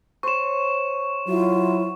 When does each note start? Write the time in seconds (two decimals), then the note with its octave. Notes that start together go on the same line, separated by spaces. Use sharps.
0.23 C5 C#5 C#6 E7
1.28 F#3 E4 F4